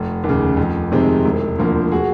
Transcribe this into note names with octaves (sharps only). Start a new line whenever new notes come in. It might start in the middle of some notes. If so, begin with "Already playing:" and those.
Already playing: F1
D#2
C#3
F2
C3 D#3 G#3 C4
E1
D2 D3 F3 A#3
F#4 G#4